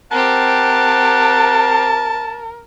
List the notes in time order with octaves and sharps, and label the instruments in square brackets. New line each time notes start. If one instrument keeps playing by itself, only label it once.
[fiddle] C4 G4 [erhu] A#4 [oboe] F#5 [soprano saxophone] A5